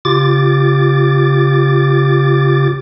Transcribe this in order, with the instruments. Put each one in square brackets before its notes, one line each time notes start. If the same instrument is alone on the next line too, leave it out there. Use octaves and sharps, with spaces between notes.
[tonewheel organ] C#3 F4 G4 D6 A6